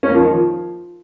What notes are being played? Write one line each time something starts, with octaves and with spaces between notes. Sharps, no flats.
C#4
A#3
F3
D#3
F3